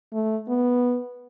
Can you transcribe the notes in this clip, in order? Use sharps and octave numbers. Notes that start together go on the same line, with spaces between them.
A3
B3